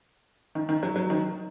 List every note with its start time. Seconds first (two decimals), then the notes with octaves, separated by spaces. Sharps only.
0.55 D#3
0.69 D#3
0.83 F#3
0.96 F#3
1.10 D#3